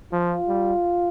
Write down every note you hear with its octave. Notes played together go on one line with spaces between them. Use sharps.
F3 F4
G3